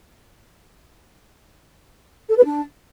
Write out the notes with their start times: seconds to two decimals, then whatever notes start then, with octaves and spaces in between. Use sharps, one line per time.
2.29 A4
2.37 B4
2.44 D4